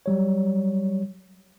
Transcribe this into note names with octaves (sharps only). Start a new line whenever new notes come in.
F#3 G3 C#5